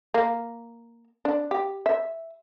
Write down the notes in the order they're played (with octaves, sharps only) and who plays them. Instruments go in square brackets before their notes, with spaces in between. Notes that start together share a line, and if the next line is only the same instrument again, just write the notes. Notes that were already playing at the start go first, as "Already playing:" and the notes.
[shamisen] A#3
D4
G4
E5